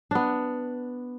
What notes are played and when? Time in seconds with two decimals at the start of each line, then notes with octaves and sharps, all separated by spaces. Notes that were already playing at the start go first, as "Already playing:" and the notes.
0.11 B3 D4